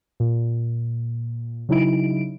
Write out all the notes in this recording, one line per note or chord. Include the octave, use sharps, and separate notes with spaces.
A#2
C#3 F#3 D#4 E4 D7